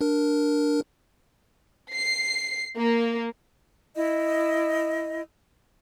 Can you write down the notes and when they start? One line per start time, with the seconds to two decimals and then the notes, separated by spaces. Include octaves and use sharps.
0.01 D4 A#4
1.93 C7
2.78 A#3
3.96 E4 D#5